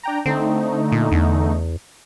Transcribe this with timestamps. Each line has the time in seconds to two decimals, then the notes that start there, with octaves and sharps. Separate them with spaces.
0.03 D4 G5 A#5
0.26 D3 A3 C4 D#4
0.92 A#2
1.12 E2